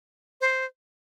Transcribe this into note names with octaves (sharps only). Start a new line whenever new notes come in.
C5